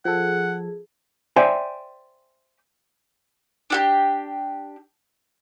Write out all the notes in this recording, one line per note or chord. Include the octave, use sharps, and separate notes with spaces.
F3 G#4 A4 F#5
C5 D5 E5 G5 G#5
D4 F#4 G4